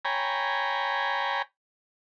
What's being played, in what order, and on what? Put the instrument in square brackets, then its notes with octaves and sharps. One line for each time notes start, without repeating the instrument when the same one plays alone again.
[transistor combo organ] C#5 G5 G#5 A#5 B5